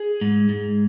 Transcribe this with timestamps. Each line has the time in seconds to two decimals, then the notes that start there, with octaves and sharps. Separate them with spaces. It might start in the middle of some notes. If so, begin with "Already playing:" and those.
Already playing: G#4
0.21 G#2
0.49 G#2